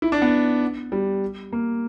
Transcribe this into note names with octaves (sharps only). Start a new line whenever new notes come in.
E4
D4
B3
G3
A#3